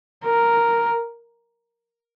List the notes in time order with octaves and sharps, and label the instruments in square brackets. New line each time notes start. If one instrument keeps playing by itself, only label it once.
[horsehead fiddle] A#4